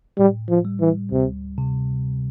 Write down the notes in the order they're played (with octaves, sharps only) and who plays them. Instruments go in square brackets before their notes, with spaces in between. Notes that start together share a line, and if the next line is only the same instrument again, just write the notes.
[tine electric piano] A2 [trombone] G3
[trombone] F3
[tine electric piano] G3
[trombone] E3
[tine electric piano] D2 [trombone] C3
[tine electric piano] C3